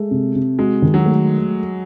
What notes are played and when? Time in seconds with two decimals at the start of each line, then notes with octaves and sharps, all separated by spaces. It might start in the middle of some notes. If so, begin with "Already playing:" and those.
Already playing: G#3 A3
0.11 C3
0.35 C3
0.59 G#3 F#4
0.82 D#3
0.94 F#3
1.06 A3